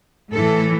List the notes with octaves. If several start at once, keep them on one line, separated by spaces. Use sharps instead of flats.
A2 E3 A4